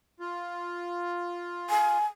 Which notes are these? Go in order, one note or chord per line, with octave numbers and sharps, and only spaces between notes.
F4
G#5